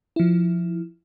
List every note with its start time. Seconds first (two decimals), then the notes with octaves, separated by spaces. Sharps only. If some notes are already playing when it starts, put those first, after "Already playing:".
0.16 F3 E4